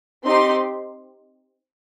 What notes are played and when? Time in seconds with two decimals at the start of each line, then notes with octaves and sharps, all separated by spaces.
0.24 C4 D#4 G4 C6